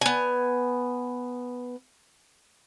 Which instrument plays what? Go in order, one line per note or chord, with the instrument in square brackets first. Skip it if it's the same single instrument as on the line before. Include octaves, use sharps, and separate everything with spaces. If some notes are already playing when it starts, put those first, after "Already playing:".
[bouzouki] B3 G#5